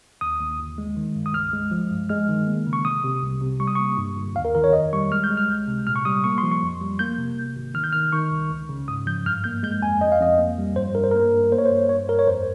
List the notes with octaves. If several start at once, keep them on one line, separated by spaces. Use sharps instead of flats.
D#2 D#6
D#2
G1
G#3
D#3
G2
D#6
C#2 F6
G#3
F3
G2
G#3 F6
D#3
A#3
C#3
C#6
C3 D#6
C3
C2
C3
G3 C#6
D#6
A#3 C#6
G2
G1
D#2 F5
A#4
D#3 A#4
C#5
F2 D#5
G3 C#6
G#3 F6
G6
G#3
F6
C#2
C3
A#2 F6
C#6
G3 D#6
A#3 C#6
F3 C6
C#6
F2
G3
A#3 G6
C3
G#1
G#1
D#3 F6
G6
D#3 F6
D#3 C#6
C2
C#2
C#3
G#2 D#6
F3 G6
G2 F6
A#3 G6
G#3 G6
F2 G#5
F2 D#5
F5
F2 D#5
A#3
G3
G2 C5
G2 A#4
C5
A#3 A#4
G2
A#3 C5
C#5
C5
G2
G2 C#5
G2 A#4
C#5
F2 C5